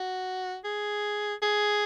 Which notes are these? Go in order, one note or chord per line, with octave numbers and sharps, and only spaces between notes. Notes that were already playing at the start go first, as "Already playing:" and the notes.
Already playing: F#4
G#4
G#4